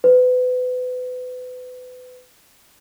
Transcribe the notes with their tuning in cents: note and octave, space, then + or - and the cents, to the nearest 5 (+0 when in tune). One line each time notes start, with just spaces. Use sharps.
B4 +30